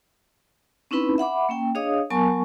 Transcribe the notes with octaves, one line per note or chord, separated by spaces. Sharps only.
C4 C#4 D#4 E4 B4 B5
E5 F#5 B5 D6
A#3 C#4 G5
D4 G#4 C#5 D#5 F5 D#6
F#3 B3 A#4 G#5 A5 C#6